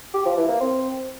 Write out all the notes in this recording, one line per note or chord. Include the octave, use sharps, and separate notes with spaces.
G4
F3
E3
A#3
C4